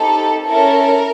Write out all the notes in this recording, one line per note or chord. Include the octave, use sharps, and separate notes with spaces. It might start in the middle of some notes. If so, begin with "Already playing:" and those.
Already playing: C4 D#4 G4 A4
C#4 E4 A4 A#4